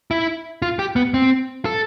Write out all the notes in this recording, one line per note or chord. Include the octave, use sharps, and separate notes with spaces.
E4
F4
G4
B3
C4
A4